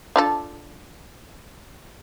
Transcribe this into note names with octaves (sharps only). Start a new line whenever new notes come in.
D4 F4 A4